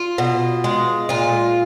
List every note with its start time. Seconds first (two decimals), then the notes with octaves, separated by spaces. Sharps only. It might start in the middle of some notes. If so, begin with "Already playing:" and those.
Already playing: F4
0.18 B2
0.64 G#3
1.09 A#2 F4